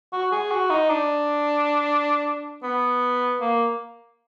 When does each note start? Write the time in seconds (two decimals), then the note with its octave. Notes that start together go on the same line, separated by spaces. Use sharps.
0.13 F#4
0.32 G#4
0.51 F#4
0.70 D#4
0.90 D4
2.63 B3
3.41 A#3